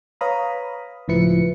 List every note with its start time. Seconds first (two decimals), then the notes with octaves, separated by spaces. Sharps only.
0.21 B4 C#5 F5 A#5 B5 D#6
1.08 C#2 A2 F3 E4 B4 C#7